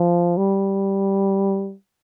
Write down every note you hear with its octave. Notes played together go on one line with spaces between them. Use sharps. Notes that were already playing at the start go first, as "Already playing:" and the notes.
Already playing: F3
G3